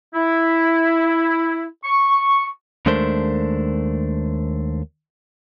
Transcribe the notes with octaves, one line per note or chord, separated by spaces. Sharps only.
E4
C#6
D#2 G#3 A3 D4 A#4 C5